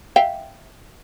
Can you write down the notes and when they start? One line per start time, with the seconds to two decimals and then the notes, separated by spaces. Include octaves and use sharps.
0.16 E5 F5 G5